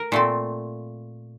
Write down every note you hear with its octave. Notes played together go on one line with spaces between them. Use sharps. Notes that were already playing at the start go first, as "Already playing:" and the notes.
Already playing: A#4
A#2 A3 C4